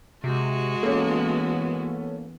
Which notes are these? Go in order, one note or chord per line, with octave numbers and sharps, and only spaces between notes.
C3 G#3 F#4
E3 A#3 B3 C#4 A4